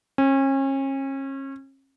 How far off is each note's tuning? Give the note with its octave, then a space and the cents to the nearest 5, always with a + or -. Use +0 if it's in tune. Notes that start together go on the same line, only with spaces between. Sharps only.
C#4 -35